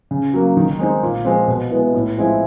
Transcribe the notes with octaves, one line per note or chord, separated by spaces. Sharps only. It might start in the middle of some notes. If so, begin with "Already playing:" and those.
C#3
F#3 A#3
D#3
G#3 C4 D#4
A#2
F3 G#3 C4
B2
G#3 B3 E4
A2
F3 G#3 C4 E4